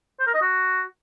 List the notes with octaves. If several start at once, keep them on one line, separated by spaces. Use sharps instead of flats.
C5
A#4
D#5
F#4